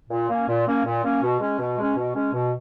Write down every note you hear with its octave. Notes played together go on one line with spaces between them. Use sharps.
A#2
A#3 C#4
A#2
A#3 C#4
A#2
A#3 C#4
B2
G#3 C#4
B2
G#3 C#4
B2
G#3 C#4
B2